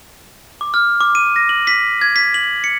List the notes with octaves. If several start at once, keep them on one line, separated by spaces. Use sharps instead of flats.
D6
F6
D6
D#7
A#6
F#7
B6
G#6
B6
F#7
C#7